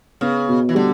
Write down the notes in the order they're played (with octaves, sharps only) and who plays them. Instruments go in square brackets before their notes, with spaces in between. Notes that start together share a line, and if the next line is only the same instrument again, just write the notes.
[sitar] C#3 [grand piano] B3
[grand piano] B2
[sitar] E3
[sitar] D3 [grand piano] G3